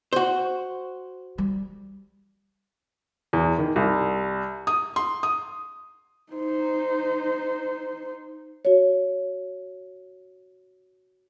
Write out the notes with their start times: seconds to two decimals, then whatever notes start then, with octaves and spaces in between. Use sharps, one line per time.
0.13 F#4 C5
1.38 G3
3.33 E2
3.59 D#3
3.76 C2
4.67 D#6
4.96 C6
5.23 D#6
6.33 D#4 C5
8.65 F#4 C#5